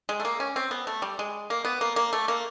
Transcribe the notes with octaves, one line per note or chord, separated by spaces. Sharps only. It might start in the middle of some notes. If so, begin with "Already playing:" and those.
G#3
A3
A#3
C#4
C4
B3
A3
G3
G#3
A#3
B3
A#3
A#3
A3
A#3